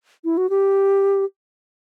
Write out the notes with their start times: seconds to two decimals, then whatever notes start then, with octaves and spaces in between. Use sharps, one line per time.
0.25 E4
0.37 F#4
0.50 G4